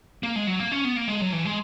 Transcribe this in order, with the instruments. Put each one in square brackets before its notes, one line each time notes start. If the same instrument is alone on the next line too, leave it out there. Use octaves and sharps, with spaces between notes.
[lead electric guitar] A#3
G#3
F#3
A#3
C#4
B3
A#3
G#3
F#3
E3
G#3